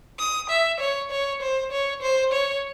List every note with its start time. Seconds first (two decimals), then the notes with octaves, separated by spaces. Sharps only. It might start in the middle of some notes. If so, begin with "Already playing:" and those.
0.19 D#6
0.50 E5
0.80 C#5
1.11 C#5
1.42 C5
1.72 C#5
2.02 C5
2.33 C#5